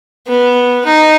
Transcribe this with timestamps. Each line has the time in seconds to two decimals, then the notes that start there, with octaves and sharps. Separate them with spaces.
0.27 B3
0.86 D#4